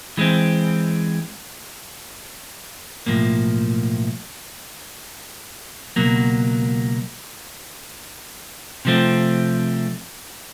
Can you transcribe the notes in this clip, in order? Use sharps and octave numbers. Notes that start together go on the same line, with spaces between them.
E3 G#3 C4
B1 A2 F3 A#3
C#2 B2 F#3 A#3
C3 F3 A3 C4